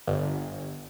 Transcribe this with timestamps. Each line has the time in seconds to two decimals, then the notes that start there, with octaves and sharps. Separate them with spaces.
0.08 G1